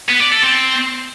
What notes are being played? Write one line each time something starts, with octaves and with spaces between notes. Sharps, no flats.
B3
D5
A4
C4